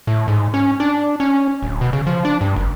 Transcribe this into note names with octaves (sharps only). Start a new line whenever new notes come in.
A2
G#2
C#4
D4
C#4
D1
B2
C#3
F3
D4
G2
F#1